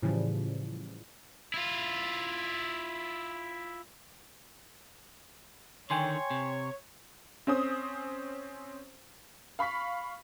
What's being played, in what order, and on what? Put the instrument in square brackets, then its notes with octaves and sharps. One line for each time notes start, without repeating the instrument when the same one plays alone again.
[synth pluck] A2 C#3 E3 F3 G3
[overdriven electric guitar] E4 F4
[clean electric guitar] D3 D#3 [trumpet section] C#5 [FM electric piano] G5 G#5 C6
[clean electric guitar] C3
[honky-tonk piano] C4 C#4 C5 D#6
F5 B5 C#6 B6